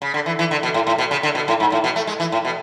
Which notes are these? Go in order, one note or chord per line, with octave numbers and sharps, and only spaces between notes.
C#3
D3
E3
E3
D3
B2
A2
A2
B2
C#3
D3
B2
A2
G#2
A2
B2
A3
G#3
E3
A2
B2